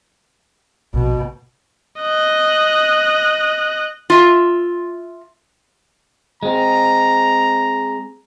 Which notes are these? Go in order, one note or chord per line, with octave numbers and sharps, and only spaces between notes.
A#1 B2
D#5 F#6
F4 E5
G#3 C4 A#5